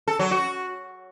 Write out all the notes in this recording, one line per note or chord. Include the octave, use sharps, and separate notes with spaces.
A4
F#3
F#4